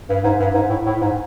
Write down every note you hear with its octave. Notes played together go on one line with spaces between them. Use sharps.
G2
G#2
G2
G#2
A2
A2
G#2